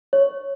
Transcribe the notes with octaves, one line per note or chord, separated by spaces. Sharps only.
C#5